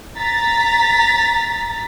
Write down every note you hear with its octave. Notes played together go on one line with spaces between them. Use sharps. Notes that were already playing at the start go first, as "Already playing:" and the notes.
A#5 A6 B6